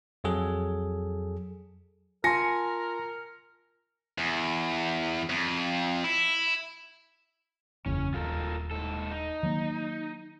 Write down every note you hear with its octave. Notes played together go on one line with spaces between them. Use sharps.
F2 F#3 G#4 A4
F4 A#4 G#5 A5 C6 A#6 C#7
E2
F2
E4
F#1 E2 C#3 C#4
D#1 F4 A4 A#4
G#2 A4
D#4
D#3 F#3 A#3